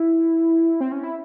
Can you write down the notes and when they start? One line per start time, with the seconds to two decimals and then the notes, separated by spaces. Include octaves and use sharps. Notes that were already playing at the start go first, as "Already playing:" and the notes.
Already playing: E4
0.80 C4
0.92 C#4
1.03 E4